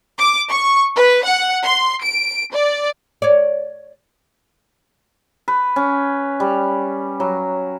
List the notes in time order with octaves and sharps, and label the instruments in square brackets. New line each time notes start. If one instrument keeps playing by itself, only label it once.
[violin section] D6
C#6
B4
F#5
C6
D7
D5
[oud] C#5 D5
[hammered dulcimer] B4
C#4
G3
F#3